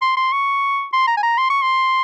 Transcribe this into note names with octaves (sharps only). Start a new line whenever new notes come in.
C6
C6
C#6
C6
A#5
G#5
A#5
C6
C#6
C6